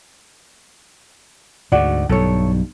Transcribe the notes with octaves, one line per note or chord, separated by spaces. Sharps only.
D2 G#2 F#4 D5
B1 G2 A4 C#5